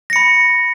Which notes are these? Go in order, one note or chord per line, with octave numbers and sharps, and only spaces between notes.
B5 A#6 C#7